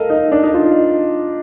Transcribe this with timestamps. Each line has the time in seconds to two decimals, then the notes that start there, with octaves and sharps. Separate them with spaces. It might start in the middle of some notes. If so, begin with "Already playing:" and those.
Already playing: A4 A#4 D#5 F5
0.10 D#4
0.32 D4
0.43 D#4
0.54 F4